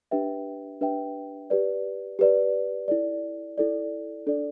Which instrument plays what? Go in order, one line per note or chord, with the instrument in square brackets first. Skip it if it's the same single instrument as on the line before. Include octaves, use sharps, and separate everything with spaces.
[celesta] D4 G4 B4 E5 G5
D4 G4 B4 E5 G5
G4 B4 D5
G4 B4 D5
E4 A4 D5
E4 A4 D5
D4 A4 D5